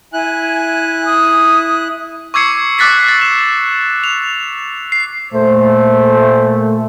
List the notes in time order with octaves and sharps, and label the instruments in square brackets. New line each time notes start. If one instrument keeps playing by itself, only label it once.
[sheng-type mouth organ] E4 F#6 [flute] G#5
[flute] D#6
[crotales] C#6 D6 E6 G#6 C7 C#7
D6 E6 F#6 A6 B6 C7
A6
E7
F7
C7
[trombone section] A#2 A3 [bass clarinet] C5